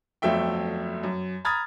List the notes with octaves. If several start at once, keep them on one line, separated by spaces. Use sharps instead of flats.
G1 F2 F#3 A3 E5 G5
F#2
A#5 B5 D#6 F6 G#6 A6